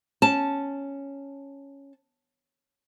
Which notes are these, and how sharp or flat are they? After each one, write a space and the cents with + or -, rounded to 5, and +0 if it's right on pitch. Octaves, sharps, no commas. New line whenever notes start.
C#4 +0 A5 +0